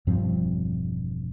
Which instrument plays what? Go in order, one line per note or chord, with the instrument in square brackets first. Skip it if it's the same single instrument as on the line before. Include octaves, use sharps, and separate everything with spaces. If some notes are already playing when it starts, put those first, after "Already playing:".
[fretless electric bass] E1 G2 F3 C4